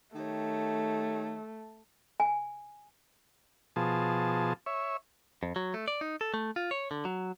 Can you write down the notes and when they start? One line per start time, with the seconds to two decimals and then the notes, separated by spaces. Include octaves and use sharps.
0.16 D#3 A3 G4 C#5
2.20 G#5
3.76 B2 F3 G#4 A5
4.66 C#5 E5
5.43 F2
5.56 F#3
5.74 A3
5.88 D5
6.01 D#4
6.21 A4
6.34 A3
6.56 F4
6.71 C#5
6.91 D3
7.05 F#3